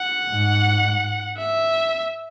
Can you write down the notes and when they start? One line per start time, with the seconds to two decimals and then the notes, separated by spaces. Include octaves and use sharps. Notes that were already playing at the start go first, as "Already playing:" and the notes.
Already playing: F#5
0.29 G#2
1.38 E5